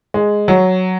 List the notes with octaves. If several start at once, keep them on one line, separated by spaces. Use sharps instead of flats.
G#3
F#3